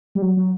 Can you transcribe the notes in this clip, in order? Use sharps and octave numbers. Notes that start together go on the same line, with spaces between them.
G3
F#3
F#3